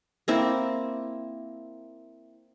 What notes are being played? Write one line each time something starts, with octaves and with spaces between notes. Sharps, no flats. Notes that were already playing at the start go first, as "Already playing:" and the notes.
A#3 C4 E4